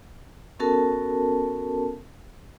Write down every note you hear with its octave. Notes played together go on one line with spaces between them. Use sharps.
B3 C#4 F#4 A4 A#4 A5